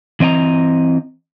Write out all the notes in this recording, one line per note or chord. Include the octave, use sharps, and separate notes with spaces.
E3 C4 D#5 G5 A#5